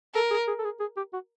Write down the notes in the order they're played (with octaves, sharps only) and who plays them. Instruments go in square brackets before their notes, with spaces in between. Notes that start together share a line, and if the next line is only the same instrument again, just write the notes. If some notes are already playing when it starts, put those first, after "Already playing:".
[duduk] A4 [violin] A#4
[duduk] G#4
G#4
A4
G#4
G#4
G4
F#4